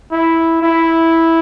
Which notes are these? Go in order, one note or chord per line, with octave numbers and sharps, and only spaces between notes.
E4
E4